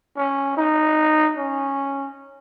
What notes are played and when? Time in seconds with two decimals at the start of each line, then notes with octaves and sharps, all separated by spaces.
0.17 C#4
0.57 D#4
1.37 C#4